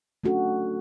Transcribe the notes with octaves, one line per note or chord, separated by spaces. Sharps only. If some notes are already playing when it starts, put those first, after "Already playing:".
A3 C#4 D4 F#4 A4